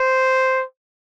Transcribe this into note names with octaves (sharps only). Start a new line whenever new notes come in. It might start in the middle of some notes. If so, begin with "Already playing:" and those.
Already playing: C5